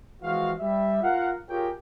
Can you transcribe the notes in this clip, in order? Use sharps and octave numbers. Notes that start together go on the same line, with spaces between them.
E3 F3 G#3 F#4 F5
G3 E5
F4 A#4 F5 F#5
F4 G4 G#4 A#4 C#5 G5